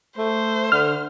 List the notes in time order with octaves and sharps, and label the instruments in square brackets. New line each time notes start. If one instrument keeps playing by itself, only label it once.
[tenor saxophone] A3 [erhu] C5
[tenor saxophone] D3 [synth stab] F6